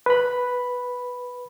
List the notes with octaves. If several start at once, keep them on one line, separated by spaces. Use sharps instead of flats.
B4 B5